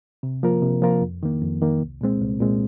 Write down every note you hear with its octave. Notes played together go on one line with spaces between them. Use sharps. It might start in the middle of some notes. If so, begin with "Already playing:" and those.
C3
F3 A#3 F4 A#4
C3
F3 A#3 F4 A#4
F2
D#3 A#3
F2
D#3 A#3
C2
A#2 G#3 C4
C2
A#2 G#3 C4